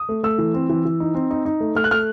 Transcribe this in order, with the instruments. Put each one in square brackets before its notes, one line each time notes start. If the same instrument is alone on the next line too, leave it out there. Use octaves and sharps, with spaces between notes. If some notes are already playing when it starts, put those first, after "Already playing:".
Already playing: [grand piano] D#6
A3
A3 E6
E3
C4
E3
E3
D#4
C4
D#4
D#4
A3
A3 F6
F#6
A3 F6